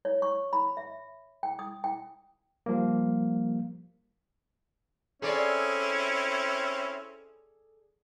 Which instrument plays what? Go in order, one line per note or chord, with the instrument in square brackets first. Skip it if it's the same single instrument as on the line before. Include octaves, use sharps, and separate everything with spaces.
[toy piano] C#5
C#6
B5
E5
G5
D#6
G5
[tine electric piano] F3 G3 A#3
[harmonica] C4 C#4 E4 [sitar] G#4 A4 D5